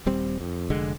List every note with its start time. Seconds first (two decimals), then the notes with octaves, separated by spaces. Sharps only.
0.06 D#1 G3 C4
0.41 F2
0.70 F1 D3 G#3